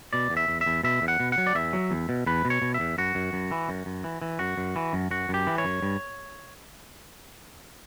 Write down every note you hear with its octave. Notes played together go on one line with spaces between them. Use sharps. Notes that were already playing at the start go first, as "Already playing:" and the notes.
B2 D5
E2
E5
E2
E5
E2
B2 E5
E2
F#5
B2
F#5
F#3
D5
E2 E5
F#3
E2
B2
E2 B4
B2
C#5
B2
E5
E2
F#2 F#4
F#2
F#2
E3
F#2
F#2
E3
E3
F#2 F#4
F#2
E3
F#2
F#2 F#4
F#2 G4
E3
C#5
F#2
G2